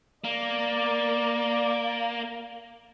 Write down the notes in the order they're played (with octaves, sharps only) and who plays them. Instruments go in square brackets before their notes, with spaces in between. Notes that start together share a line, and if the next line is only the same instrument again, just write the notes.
[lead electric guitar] A#3 [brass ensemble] D5